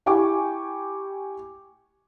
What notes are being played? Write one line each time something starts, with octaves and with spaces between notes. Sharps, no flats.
E4 G4 G5 G#5 C#6 D6